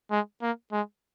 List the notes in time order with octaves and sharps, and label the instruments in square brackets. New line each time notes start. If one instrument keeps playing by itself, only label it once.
[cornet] G#3
A#3
G#3